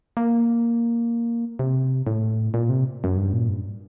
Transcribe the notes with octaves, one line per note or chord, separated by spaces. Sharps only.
A#3
C3
A2
A#2
C3
F#2
G2
A#2
G2